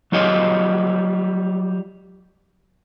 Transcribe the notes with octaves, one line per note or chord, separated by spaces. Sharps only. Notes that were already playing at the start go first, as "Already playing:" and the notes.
F#3 G3 F4 C#5 D#5